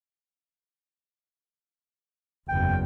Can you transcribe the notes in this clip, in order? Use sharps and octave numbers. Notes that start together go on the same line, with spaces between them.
F#1 E2 G5